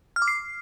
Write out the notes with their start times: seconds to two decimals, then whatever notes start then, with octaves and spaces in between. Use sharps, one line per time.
0.16 F6
0.22 D6
0.28 C7